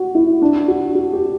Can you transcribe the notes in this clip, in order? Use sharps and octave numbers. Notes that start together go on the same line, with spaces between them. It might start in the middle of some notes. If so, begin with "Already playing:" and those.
Already playing: F#4
E4
D4
F#4
F#4
G4